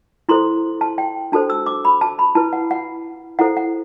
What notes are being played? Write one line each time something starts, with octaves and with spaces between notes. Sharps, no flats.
E4 A4 C5 C6
A5
G5
D4 F#4 A4 C5 A5
E6
D6
B5
A5
B5
E4 B4 A5
F#5
F#5
E4 A4 C5 F#5
F#5